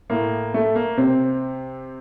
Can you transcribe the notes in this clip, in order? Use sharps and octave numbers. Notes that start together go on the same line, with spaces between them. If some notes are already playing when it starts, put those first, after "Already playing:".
A2 A#3
A3
A#3
C3 C4